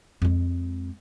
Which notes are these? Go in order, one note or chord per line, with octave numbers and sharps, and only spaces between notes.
F2 G#3